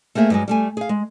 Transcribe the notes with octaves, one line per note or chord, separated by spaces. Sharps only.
A3 A#3 C4 G#4 E5
G2 F#3 G#3
G3 A3 G#5
G#4 F5
G#3